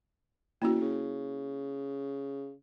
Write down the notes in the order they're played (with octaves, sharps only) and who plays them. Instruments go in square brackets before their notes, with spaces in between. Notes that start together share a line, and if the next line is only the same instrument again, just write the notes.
[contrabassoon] E2 [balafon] A#3 C#4 F#4 [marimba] E4
[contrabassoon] C#3